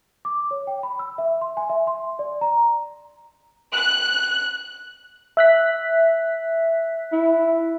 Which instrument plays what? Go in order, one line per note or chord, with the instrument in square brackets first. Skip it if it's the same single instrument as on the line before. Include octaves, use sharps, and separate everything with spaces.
[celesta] D6
C#5
G5
B5
E6
E5
C6
G#5
E5
C6
D5
A#5
[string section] F#6
[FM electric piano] E5 F#6 B6
[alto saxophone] E4